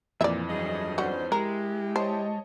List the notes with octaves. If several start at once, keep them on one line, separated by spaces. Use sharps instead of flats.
F2 A#2 E3 D5 E5
G2 F#3 G#4 D#5
G#2 D3 C#4 F#4 C5
G#3 E4 G4 A#4
C5 C#5 D#5 A5